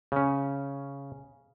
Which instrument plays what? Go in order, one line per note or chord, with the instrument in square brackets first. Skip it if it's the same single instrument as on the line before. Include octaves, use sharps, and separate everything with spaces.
[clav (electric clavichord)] C#3 C#4